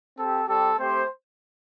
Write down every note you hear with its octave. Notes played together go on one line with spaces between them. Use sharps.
C4 G4 A4
G3 C4 G4 A4
A3 C4 G4 C5